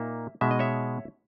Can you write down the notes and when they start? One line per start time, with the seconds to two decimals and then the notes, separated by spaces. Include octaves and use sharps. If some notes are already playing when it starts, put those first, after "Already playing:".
Already playing: A#2 A#3 D#4 E5
0.41 B2 G#3 D#4 E5
0.51 D#5
0.59 C#5 E5